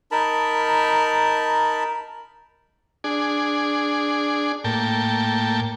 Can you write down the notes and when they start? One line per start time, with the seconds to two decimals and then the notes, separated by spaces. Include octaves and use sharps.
0.11 D#4 A#4 A5 B5
3.04 D4 G#4
4.64 A2 A#3 G5 A5